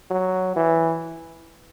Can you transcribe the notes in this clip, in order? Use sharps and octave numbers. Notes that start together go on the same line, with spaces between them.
F#3
E3